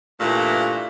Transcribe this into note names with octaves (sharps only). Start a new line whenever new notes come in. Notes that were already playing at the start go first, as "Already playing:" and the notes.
G2 A#2 E3 A3